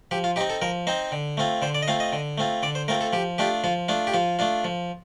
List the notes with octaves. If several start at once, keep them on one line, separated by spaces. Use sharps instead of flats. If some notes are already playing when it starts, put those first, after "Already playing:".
F3 G4
F4
C4 D#4 G4
A4
F3 A#4
C4 D#4 C5
D3
A3 C4 F4
D3 C5
D5
D#5
A3 C4 F4 F5
D#5
D3
A3 C4 F4
D3 D5
C5
A3 C4 F4 A#4
A4
F3 G4
A3 D4 F4 G4
F3 F4
A3 D4 F4
G4
F3 F4
A3 D4 F4
F3